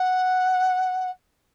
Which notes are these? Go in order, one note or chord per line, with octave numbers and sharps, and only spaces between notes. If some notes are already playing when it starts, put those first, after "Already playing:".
Already playing: F#5